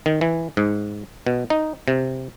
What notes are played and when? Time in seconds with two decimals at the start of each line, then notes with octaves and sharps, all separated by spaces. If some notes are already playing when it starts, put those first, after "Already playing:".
0.06 D#3
0.21 E3
0.57 G#2
1.27 B2
1.50 D#4
1.88 C3